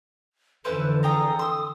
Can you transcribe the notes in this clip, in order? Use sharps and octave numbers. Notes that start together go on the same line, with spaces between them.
F2 D3 E3 C#4 E4 A4 B4 C5
G#4 G5 A#5 D#6
C6 E6